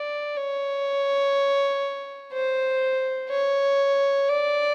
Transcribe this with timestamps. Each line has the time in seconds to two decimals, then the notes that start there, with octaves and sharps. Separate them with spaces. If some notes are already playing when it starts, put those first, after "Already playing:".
Already playing: D5
0.37 C#5
2.33 C5
3.31 C#5
4.29 D5